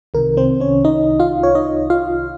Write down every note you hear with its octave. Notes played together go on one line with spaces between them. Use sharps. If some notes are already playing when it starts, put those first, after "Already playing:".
C2 C3 D#3 A#4
C4 C5
C#4 C#5
D#4 D#5
F4 F5
C#5
D#4 D#5
F4 F5